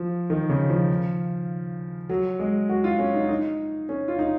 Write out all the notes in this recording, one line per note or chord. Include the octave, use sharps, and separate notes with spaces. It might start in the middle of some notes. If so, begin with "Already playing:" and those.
Already playing: F3
D#3
C#3
F3
F#3
G#3
F#4
F4
C#4
D#4
D#4
C#4
F4
D#4